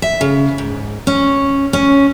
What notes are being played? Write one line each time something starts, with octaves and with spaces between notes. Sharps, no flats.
E5
C#3
G#2
C#4
C#4